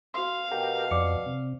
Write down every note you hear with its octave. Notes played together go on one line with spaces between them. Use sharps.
F#4 F5 C6
B2 G4 A#4 F#5 G5
F2 D5 D6 C#7
C3